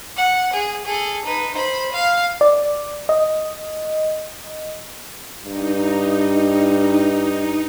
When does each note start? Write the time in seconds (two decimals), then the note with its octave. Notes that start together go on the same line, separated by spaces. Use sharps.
0.17 F#5
0.53 G#4
0.85 G#4 A4
1.25 D#4 B4
1.54 C5 B5
1.92 F5
2.41 D5
3.09 D#5
5.44 G2 D#4